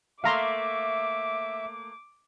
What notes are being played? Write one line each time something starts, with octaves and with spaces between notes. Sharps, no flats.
A3 A#3 E5 F5 A#5 C6 D6